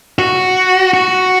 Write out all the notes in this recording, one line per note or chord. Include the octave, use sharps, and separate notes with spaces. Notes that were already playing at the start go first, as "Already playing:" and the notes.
F#4
F#4